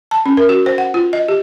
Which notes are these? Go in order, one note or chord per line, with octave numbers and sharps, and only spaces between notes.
A5
C#4
A#4
F#4
C5
F#5
F4
D#5
G4